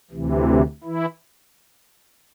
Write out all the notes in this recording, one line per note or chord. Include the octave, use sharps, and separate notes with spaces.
D2 C3 E3
E3 E4